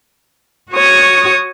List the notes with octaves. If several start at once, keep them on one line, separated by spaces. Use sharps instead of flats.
F#4 C#5 C#6 D#6